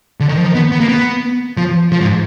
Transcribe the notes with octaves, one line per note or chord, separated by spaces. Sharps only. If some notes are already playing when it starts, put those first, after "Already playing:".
D3
D#3
F3
D#3
B3
B3
A#3
B3
F3
F3
G#2